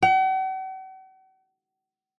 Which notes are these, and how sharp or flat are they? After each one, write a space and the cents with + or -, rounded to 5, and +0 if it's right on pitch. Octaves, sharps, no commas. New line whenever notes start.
F#5 +45